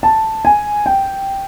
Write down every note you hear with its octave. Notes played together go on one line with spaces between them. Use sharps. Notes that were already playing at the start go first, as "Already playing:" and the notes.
A5
G#5
G5